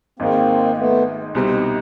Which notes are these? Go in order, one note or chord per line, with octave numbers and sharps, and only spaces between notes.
G#1 G#2 D#3 G#3 A#3 C4
A3 B3
C2 B2 G3 C4 D#4